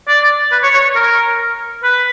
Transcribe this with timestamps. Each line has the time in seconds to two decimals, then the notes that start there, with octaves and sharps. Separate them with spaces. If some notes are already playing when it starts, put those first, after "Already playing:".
0.08 D5
0.52 B4
0.63 C#5
0.74 C#5
0.95 A#4
1.83 B4